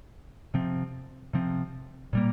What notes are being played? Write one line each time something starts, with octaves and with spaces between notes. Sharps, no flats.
C3 F3 C4
C3 F3 C4
A#2 G3 A#3